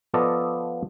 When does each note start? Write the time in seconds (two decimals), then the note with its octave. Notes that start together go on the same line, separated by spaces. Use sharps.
0.14 F3 B3 F4 A4 D5 D#5